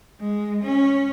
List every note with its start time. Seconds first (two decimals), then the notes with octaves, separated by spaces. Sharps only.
0.21 G#3
0.63 C#4